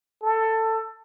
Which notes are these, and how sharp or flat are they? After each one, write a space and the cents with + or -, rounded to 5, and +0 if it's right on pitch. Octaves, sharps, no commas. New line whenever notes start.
A4 +15